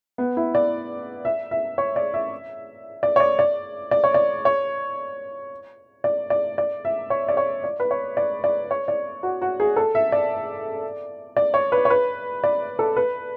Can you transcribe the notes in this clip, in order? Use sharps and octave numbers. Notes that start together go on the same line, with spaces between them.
B3
E4
D5
E5
E5
C#5
D5
E5
D5
C#5
D5
D5
D5
C#5
D5
C#5
D5
D5
D5
E5
C#5
D5
C#5
D5
B4
C#5
D5
D5
C#5
D5
F#4
F#4
G#4
A4
E5
D5
D5
C#5
B4
C#5
B4
D5
A4
B4